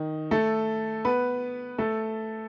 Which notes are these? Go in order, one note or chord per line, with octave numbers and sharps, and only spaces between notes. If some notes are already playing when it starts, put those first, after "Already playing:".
Already playing: D#3 D#4
A3 A4
B3 B4
A3 A4